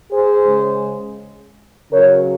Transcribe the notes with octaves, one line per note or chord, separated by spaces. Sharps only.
G#4 C5
C#3 G#3
C#3 F#3 A#4 C#5